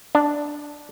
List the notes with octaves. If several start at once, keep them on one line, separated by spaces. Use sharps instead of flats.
D4